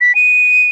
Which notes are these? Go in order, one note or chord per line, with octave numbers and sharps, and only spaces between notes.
B6
D#7